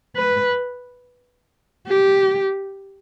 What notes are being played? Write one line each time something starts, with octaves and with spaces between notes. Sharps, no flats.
B4
G4